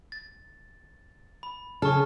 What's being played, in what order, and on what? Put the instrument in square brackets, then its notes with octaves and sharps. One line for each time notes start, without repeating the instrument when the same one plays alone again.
[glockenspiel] A6
B5
[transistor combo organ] C#3 G#4 [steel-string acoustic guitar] A4 [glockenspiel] C#6 F6